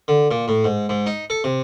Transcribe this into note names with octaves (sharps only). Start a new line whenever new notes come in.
D3
A#2
A2
G#2
G#2
D#4
A4
C3